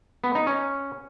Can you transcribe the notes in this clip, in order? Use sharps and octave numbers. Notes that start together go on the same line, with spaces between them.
B3
D#4
C#4